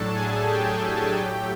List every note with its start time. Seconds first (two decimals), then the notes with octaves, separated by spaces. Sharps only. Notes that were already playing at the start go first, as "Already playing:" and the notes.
Already playing: A2 F#3 A3 D4 A4 A5
0.15 G#4 G#5
0.48 G4 G5
1.17 A2 F#3 A3